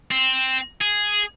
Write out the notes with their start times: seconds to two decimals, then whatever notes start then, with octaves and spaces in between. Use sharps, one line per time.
0.11 C4
0.81 G#4